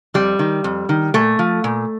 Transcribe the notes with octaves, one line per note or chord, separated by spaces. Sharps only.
F2 G3
D#3
F2
D#3
A#2 A3
F3
A#2